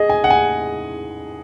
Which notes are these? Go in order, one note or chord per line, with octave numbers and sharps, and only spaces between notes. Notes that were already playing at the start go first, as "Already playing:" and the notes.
Already playing: G#4 D#5
G#5
F#5
G#5